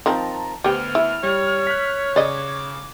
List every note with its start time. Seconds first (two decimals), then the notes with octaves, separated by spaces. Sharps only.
0.06 D#3 F3 C4 A5 A#5
0.64 D2 B3 G4 C5 G5 F6
0.95 E4
1.23 G3 C#5
1.67 F#6 B6
2.16 C#3 D5 D#5 D6 G#6